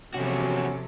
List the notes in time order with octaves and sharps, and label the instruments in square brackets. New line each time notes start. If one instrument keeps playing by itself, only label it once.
[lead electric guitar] E2 F#4 [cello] C3 [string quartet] F3 F#3 A4 [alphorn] C#4